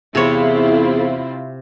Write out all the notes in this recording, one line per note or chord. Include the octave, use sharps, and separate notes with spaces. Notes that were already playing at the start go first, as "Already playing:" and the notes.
E2 C3 C4 E4 F4 G#4 C#5